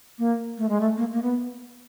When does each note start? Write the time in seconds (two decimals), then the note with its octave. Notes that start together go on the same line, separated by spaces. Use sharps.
0.19 A#3
0.58 A3
0.69 G#3
0.81 A3
0.97 A#3
1.13 A#3
1.22 B3